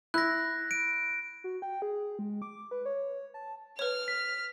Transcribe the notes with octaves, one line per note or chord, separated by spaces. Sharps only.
E4 F#6 A#6
D7
F#4
G5
G#4
G#3
D6
B4
C#5
A5
B4 C#5 F6
B6